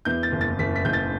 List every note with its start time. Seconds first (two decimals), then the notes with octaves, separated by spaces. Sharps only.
0.05 E2 G6
0.23 A6
0.32 F#1
0.41 A6
0.59 F#1 B6
0.76 B6
0.85 F#1 G6
0.93 A6